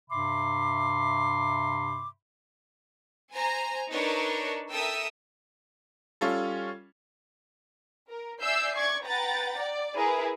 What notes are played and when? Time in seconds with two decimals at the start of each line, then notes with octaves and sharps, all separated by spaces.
0.10 G2 C3 E5 B5 C6 D6
3.34 C5 G#5 A#5
3.92 D4 D#4 A#4 B4 C#5
4.70 A4 A#4 E5 G5 D#6 E6
6.21 G3 C#4 F4 A4
8.09 A#4
8.41 D5 E5 G#5 E6 G6 C7
8.76 D5 C#6 G#6
9.06 B4 F#5 G5 A#5 A6
9.61 D5
9.95 E4 G#4 A#4 B4